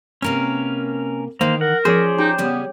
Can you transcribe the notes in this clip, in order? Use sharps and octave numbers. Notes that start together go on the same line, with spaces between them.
C3 A#3 C#4 A#4 B4
D#3 E3 A#3 C5
A#4 F#5
F3 C#4 G#4 C5 D5
D#4 G4
C#3 G3 B3 C#4